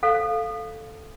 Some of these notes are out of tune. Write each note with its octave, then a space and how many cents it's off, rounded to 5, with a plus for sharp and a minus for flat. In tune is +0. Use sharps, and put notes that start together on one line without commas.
A4 +0 C5 +15 F5 +5